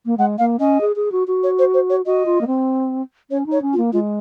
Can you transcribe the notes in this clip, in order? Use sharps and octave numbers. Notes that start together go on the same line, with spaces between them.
A#3
G#3 F#5
A#3 F5
C#4 D#5
G#4
G#4
F#4
F#4
C#5
C5
C5
C#5
F#4 D#5
F4
A#3
C4
C#4 C#5
D#4
C#5
C#4
F4
A#3
G#3 F4